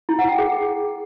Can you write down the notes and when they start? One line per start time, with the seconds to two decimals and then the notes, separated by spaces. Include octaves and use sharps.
0.09 E4
0.19 F#5
0.29 G5
0.38 G#4